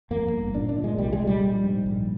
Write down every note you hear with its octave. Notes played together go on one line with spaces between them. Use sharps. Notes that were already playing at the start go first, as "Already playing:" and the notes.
F2 A#3
G1
A#2 D4
D4
A#2
G#3
C2 G3
G#3
A#2
G3
A#1
G#2
A#1